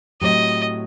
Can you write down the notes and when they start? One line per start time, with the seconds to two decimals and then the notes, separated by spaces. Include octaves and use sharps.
0.21 A2 F#3 C4 G4 C5 D#5